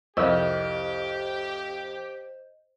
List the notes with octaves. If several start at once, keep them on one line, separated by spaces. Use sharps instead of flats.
C2 F2 G4 C5 D#5 E6